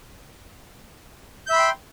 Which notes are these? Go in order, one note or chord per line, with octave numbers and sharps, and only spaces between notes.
E5 G5 B5 C6 G6